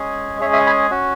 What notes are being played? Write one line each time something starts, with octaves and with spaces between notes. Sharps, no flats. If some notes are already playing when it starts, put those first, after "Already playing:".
Already playing: G#3 C#4 G#4
G#3 C#4 G#4 C#5 E5
E5 G#5
G#5 B5
C#4 F#4